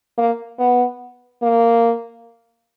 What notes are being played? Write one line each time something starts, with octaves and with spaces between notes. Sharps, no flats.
A#3
B3
A#3